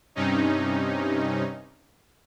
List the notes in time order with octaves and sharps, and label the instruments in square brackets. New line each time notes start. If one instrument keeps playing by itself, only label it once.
[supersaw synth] G2 C3 C#4 D#4